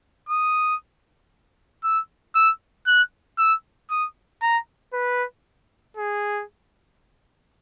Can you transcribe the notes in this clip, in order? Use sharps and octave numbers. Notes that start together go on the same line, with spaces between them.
D#6
E6
E6
F#6
E6
D#6
A#5
B4
G#4